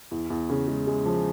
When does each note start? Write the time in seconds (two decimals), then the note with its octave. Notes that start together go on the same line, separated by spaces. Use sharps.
0.11 E2
0.30 E2
0.50 C#3
0.68 G#3
0.87 G#3
1.05 F3